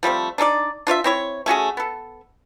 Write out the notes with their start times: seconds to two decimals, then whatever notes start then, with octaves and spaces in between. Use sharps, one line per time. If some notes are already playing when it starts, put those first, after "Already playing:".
0.03 F3 G3 A3 C4
0.38 D4 D#4 A4 D5
0.87 D4 F4 C#5 E5
1.04 C4 E4 C#5
1.46 A3 C#4 F#4 G#4
1.77 B3 A4